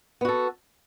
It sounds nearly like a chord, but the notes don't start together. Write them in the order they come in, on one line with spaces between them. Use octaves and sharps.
B3 F#4 A4